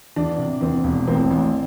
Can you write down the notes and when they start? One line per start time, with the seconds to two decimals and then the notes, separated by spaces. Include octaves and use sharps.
0.16 E2 D4
0.38 C3
0.61 E2 C4
0.84 E1
1.07 A1 C4
1.30 A1